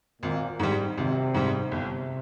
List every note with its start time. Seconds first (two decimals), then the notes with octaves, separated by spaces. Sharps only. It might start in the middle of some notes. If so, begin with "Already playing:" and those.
0.22 G#1 A#2
0.59 G#2 G3
0.97 G#1 C3
1.34 G#2 G3
1.71 G1 C3